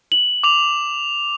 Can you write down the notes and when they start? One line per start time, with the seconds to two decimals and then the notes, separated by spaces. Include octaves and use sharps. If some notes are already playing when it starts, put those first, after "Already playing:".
0.12 F#7
0.43 D6 F7